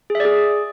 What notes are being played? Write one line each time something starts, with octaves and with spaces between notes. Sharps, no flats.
G#4
E5
D5
G#4